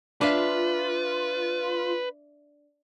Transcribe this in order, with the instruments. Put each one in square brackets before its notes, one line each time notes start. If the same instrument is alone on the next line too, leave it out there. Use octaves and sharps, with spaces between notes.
[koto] D4 E5 F5 [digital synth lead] F4 [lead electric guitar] B4